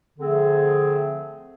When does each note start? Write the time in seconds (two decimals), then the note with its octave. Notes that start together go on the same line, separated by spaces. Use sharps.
0.19 D3 F3 A3 C4 G#4